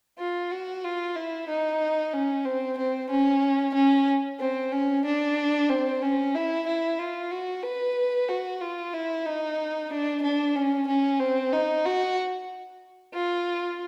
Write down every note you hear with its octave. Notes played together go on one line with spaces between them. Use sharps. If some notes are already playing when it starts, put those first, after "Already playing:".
F4
F#4
F4
E4
D#4
C#4
C4
C4
C#4
C#4
C4
C#4
D4
C4
C#4
E4
E4
F4
F#4
B4
F#4
F4
E4
D#4
D4
D4
C#4
C#4
C4
D#4
F#4
F4